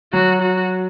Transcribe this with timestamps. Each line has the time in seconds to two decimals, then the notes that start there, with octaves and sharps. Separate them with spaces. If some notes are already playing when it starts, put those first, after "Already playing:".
0.13 F#3 F#4
0.42 F#4